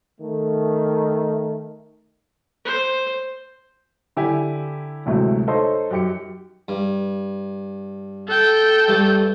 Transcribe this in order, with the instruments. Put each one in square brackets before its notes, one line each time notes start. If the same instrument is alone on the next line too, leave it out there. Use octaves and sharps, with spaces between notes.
[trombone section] D#3 A3
[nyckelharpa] C5
[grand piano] D3 E4 G4 G#5
A1 D2 C3 F#3 G#3 A3
D#4 A4 C5 C#5 C6
F#2 G4 C#7
[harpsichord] G2
[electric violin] A4 G5
[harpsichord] G2 A3